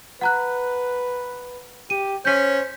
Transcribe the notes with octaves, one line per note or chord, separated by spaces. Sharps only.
B4 F#5 A#5 F#6
G4 D#7
C#4 C5 G6 B6